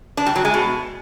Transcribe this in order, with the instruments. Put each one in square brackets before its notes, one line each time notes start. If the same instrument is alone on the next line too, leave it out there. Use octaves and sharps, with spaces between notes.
[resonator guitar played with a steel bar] D4
G3
F#3
G#3
B2